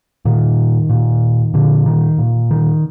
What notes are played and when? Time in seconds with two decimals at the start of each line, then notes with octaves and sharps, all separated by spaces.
0.25 A#2 D#3
0.90 A#2
1.54 A#2 D3
1.86 D#3
2.18 A#2
2.51 D#3